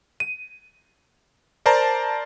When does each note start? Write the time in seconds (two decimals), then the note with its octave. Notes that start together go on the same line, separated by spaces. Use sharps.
0.20 D#7
1.66 A#4 C5 D5 A5 A#5